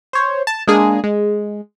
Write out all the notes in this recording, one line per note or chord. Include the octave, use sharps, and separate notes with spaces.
C5 C#5
A5
G#3 A#3 D4 G#4
G#3